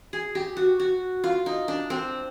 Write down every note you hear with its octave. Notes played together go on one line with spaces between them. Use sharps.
G#4
G4
F#4
F#4
F4
D#4
D4
C4